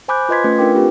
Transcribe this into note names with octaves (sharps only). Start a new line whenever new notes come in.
C5 G#5 B5 D6 F#6 G6
F4 B4 D#5 C6 G#6 B6
A3 C#4 F4 B4
D4 F4 A#4 B4 G5 D6
C4 F4 G4